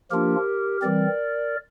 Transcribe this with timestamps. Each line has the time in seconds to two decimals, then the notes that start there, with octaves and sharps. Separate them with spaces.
0.11 F3 A#3 D4 F4 G4 A#4
0.82 E3 G3 C4 A#4 D5